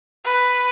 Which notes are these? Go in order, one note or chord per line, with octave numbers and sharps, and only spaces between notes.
B4